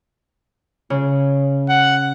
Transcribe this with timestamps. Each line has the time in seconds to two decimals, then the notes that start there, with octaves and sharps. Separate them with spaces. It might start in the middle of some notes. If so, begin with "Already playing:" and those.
0.90 C#3
1.70 F#5